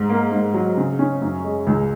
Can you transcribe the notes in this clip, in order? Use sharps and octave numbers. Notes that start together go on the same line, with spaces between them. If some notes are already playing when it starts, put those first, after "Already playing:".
Already playing: G#2
A#3
G#2
F#3
C#3
C#4
F#2
G#3
C#2